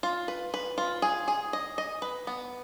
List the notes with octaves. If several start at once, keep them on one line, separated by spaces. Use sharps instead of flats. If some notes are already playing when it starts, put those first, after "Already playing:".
F4
B4
B4
F4
G#4
G#4
D#5
D#5
B4
B3